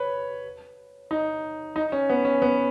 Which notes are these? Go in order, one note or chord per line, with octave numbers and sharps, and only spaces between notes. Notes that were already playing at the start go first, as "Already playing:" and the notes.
Already playing: B4 C#5
D#4
D#4
C#4
B3
C#4
B3